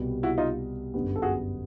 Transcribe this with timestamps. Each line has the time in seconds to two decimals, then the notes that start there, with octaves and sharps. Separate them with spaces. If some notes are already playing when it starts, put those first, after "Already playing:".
Already playing: C2 B2 G3 B3
0.23 E4 F#4
0.38 D#4 F4
0.94 G1 F#2 D3 G3 B3
1.16 A4
1.22 F#4 G#4